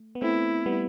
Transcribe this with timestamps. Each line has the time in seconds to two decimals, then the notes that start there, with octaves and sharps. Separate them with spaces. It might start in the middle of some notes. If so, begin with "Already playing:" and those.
Already playing: A3
0.15 B3
0.22 A3 C4 E4
0.66 G3 B3